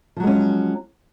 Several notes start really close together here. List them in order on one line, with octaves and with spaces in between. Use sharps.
F3 F#3 G#3 C#4